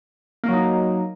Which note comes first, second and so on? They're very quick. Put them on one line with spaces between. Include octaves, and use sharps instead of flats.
A#3 F#3 D#4